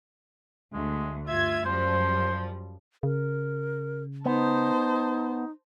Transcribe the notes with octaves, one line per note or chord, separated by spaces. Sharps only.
D2 G#3
G2 F4 E5 G#6
F#2 F3 G3 C5
C#3 A#4
B3 D#4 C5 A5